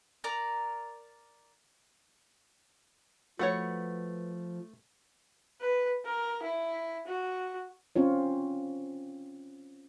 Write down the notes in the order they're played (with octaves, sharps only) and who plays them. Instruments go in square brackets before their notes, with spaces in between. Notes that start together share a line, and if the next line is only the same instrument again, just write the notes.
[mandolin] A#4 D5 A#5
[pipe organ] F3 [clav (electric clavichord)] A3 [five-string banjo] F#4 C#5 [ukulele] B4 F#5
[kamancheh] B4
A#4
E4
F#4
[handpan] C4 C#4 F4 C#5